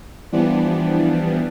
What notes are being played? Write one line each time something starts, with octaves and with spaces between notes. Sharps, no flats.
E3 F3 G3 B3 D4